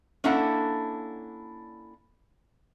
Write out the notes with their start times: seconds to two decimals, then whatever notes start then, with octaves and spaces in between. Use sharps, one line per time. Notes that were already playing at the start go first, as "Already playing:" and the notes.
0.24 A#3 C#4 D4 E4 A4 F#5